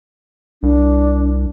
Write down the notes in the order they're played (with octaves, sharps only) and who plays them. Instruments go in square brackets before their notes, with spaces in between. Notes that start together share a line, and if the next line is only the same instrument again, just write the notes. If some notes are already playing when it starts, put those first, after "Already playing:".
[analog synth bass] C2 [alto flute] D4